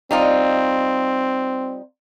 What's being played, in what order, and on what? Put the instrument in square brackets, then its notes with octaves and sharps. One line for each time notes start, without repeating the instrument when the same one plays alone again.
[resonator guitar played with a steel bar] G3 D#4 F4 [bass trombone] C4